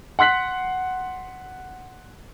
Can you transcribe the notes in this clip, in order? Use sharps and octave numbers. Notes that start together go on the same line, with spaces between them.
F#5 C6 F#6 B6 F#7